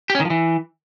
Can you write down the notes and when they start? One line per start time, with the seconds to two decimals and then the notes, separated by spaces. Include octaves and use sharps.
0.10 G4
0.15 C#4
0.20 D#3
0.25 F3
0.30 E3